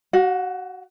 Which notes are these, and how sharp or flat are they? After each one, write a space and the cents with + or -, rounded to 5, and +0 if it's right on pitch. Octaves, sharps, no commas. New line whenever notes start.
F#4 +25 F#5 -35